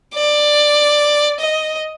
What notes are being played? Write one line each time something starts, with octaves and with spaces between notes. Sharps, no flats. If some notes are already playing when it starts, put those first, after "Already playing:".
D5
D#5